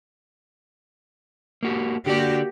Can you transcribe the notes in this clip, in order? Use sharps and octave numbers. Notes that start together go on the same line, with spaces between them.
A#3 F#4 G4
D3 A#3 F#4 G4 D5